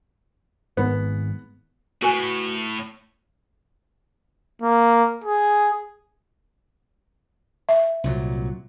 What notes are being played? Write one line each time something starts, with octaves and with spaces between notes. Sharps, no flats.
G#1 G#2 B3
A2 F#4 B4 G#5
A#3
G#4
E5
C2 A#2 F#3